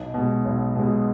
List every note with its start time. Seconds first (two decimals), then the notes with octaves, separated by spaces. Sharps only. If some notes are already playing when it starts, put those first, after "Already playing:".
Already playing: B1 D#4
0.14 B2 G#3
0.45 B1
0.76 B2 G#3